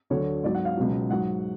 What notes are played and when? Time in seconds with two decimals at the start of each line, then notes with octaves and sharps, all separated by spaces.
0.10 D2 D3 F#3 C#5
0.44 G#2 F#3 D5
0.54 F#5
0.65 F5
0.77 C#2 B2 F#3
1.10 G#2 F#3 F#5